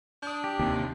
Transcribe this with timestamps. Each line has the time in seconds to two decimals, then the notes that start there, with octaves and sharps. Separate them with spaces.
0.23 D4 D#6 G6
0.44 G4
0.59 D#2 C3